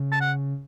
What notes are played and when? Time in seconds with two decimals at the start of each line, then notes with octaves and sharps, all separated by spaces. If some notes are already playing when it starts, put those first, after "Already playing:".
Already playing: C#3
0.12 A5
0.21 F#5